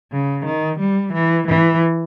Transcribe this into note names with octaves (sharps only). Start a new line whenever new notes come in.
C#3
D#3
G3
E3
E3